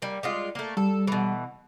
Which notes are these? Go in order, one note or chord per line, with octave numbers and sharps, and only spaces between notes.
G3 A#3
G3 G#3 F4
A3 A#3
G3 A4
B2 E3